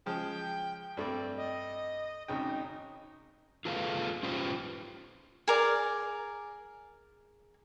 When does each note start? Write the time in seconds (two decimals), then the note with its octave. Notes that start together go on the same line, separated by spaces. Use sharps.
0.06 C#3 F3 G#3 G5
0.97 G2 A3 C4 D5
1.37 D#5
2.28 G#1 C#3 D#4 G5
3.65 F4 G#4 A4 B4 F5
4.23 C#4 F4 G4 B4 C5
5.48 G#4 A#4 D5